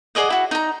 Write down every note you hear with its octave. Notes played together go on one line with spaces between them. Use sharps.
G#4 D5 D#5 F#5
E4 F#4
D#4 A#5